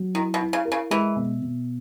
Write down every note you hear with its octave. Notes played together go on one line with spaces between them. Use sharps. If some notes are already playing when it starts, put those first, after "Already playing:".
Already playing: F#3
D#3 E4
B2
E4
C#3
A#4
C#3
E3 G#3
B2
B2